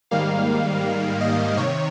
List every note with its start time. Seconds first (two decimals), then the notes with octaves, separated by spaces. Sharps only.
0.11 G#2 D#3 G3 A#3 F5
1.21 D#5
1.57 C3 D#3 C#5